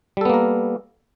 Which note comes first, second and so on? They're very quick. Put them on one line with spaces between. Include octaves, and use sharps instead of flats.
G3 A4 B3 A#3 A#4